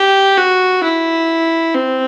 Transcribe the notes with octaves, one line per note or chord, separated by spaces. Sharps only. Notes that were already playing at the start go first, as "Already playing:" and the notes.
Already playing: G4
F#4
E4
C4